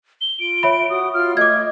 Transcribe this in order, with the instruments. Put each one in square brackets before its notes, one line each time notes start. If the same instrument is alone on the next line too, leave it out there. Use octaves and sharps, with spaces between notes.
[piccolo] G7
[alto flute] F4 [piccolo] D7
[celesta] C#5 E5 B5
[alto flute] F#4 [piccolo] D#6
[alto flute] F4 [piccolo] F6
[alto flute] A3 [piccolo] D#5 [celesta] D6 G#6